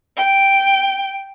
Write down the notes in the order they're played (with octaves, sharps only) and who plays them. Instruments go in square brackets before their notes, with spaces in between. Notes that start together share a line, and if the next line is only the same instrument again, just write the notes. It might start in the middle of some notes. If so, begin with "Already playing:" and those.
[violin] G5